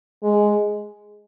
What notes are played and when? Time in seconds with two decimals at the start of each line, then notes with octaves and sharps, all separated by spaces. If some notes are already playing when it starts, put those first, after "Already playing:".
0.23 G#3